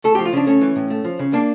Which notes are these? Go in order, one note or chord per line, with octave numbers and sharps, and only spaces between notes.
A3 A4
F3 G4
F4
C#3 D4
A3 C#4
E3
A2
A3
F3
C#3
A#3 D4